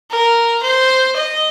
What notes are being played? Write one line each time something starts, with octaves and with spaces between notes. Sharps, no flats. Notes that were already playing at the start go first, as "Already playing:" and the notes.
A#4
C5
D#5